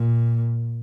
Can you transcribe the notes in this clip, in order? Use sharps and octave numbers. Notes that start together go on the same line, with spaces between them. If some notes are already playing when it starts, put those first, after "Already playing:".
Already playing: A#2